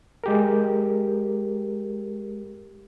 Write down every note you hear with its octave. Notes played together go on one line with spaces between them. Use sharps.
G#3 G4 A#4